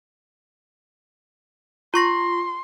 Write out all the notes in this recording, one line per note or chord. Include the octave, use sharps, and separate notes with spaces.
F4 C6 C#6 A#6